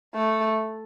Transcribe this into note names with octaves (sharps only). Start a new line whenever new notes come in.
A3